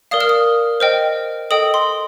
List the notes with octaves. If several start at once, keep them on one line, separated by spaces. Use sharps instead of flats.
A#4 D5 F5 D#6
F6
D#6
C5 D#5 G5 F6
A4 D#5 G5 D#6
C6